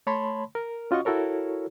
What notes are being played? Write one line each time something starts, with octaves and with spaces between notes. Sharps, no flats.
A3 C#5 A5 B5 C6
A#4
C#4 F4 F#4 D#5 C#6
E4 F#4 A4 A#4 C#5